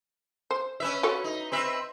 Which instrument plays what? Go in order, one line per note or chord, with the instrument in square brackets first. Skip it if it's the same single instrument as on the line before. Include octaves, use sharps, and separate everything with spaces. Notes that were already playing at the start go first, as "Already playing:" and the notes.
[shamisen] C5
[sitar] C#4 B4 E5
[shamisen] F#4 A4 C#5
[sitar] D#4
C4 B4 E5